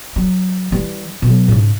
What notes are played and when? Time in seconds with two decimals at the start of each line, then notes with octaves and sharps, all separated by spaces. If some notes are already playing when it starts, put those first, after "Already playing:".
0.16 F#3
0.72 E3 G3
1.22 B2 F#3
1.48 G#2 C#3